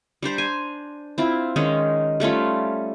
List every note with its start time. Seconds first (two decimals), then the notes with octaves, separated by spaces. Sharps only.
0.23 G3 D4 C5 A#5
0.38 G#5
1.18 C4 E4 F4
1.56 D#3 G#3 C#4 D#4
2.20 G3 A3 C#4 F4